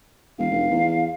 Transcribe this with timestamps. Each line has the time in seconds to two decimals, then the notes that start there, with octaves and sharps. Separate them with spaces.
0.38 E1 F5
0.51 F1
0.70 E2